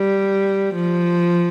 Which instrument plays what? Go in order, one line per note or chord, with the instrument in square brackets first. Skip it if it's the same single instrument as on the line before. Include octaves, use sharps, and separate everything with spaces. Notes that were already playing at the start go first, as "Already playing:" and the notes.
Already playing: [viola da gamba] G3
F3